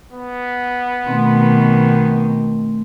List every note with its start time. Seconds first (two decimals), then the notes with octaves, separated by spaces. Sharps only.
0.12 B3
1.07 B2 D#3 A3 C4